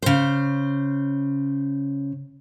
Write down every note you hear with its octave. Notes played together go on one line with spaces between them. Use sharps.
C#3 C5